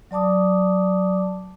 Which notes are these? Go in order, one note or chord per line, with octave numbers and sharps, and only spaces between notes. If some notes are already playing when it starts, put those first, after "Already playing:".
F#3 D5 A5 D6 D#6